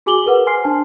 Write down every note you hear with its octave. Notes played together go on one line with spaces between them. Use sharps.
F#4 G#4 G#5 D6 F#7 G7
G#4 A#4 B4 F#5
C5 G#5 C6 F6 C7
D4 G#5 A5